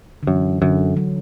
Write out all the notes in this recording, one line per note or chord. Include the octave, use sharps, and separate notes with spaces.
D3
F#2 E3
F#2 D3
F#3